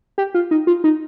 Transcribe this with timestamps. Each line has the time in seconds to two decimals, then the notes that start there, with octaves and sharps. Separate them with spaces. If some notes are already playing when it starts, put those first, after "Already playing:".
0.18 G4
0.34 F4
0.51 D#4
0.67 F4
0.84 D#4